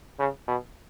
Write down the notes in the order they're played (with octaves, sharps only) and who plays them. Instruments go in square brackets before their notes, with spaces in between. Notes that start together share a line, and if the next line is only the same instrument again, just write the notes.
[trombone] C#3
B2